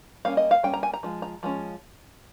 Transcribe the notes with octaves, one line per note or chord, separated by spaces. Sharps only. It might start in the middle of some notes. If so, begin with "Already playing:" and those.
G3 A#3 C#4 F5
D#5
F5
G3 A#3 C#4 G5
A#5
G#5
A#5
F3 G#3
A#5
F3 G#3 C#4